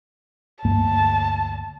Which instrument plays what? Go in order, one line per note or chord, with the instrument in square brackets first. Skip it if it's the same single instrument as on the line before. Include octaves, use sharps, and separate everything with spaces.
[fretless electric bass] D2 G2 A#3 [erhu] A5